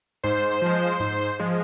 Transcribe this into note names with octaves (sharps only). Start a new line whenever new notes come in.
G#2 C5
F3 G#3
G#2
F3 G#3